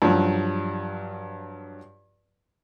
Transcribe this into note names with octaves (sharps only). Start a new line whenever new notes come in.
G2 F3 F#3